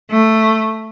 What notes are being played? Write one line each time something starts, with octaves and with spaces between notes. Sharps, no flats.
A3